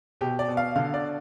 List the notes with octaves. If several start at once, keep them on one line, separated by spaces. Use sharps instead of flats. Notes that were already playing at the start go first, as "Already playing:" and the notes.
B2 G4
D5
B2
F5
D3 F5
D5